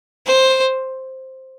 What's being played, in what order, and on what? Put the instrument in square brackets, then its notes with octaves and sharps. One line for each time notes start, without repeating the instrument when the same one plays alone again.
[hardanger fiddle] C5